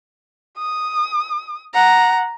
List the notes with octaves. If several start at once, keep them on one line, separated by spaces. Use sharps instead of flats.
D#6
F#5 A#5